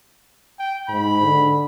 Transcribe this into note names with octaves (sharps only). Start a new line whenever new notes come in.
G5
G#2 B5
D3